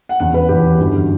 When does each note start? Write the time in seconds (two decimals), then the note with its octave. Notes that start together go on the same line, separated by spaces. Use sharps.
0.09 F#5
0.19 E2 C#3 E3 F#5
0.34 B4
0.49 E2 C#3 E3 G4
0.79 G1 F#2 E3